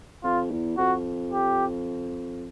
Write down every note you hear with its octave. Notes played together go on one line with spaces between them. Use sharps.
F2 F4
E2
F2 F#4
G4